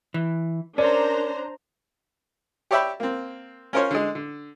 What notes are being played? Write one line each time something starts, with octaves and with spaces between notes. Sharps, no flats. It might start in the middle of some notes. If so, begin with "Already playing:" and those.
E3
C#4 D4 A#4 C5 D5 A#5
G4 C#5 D5 E5 G5 B5
A#3 C4
C#4 F4 A#4 C5 C#5
D3 G#3
D3